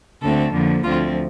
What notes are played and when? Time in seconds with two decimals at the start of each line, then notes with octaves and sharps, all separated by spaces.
0.22 D2 D3 A3 C4 A4
0.53 F2 D3 F3 A#3
0.84 D2 D3 F3 C4 F4